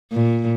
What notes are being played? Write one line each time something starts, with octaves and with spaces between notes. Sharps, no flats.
A#2